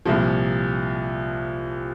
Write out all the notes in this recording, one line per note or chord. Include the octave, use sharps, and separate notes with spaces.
C2 A#2 F3